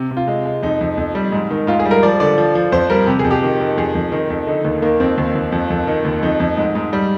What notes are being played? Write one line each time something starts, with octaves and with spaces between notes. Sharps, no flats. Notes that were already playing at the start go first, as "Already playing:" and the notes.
Already playing: C3
C3
F4
G#3
G#3
F2 D#4
F2
F2
G3
G#2
D#3
G#2 F4
G#4
G3
A#4
F3 D5
D3 D5
F3
F3
F2 C5
G3 A#4
C3 G4
G#4
F2
G4
D#3
D#3
F2 G#4
F2
D#3
F2
D3 D#4
D#2
D#3 A#3
F2 C4
D#2
D#2
F2
F2
D#3
D#2
F2 D#4
F2
G#2
G#2
G3